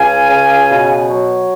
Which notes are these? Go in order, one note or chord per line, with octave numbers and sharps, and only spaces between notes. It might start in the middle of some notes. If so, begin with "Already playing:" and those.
Already playing: C#2 F5 G#5
C#3
B2
F#3